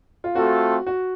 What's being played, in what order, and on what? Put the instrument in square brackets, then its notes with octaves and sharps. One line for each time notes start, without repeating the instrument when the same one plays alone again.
[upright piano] F4
[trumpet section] A3 C4 F4 A4 [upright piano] F#4
[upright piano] F#4